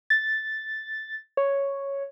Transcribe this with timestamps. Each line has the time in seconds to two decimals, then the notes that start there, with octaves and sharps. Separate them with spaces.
0.10 A6
1.37 C#5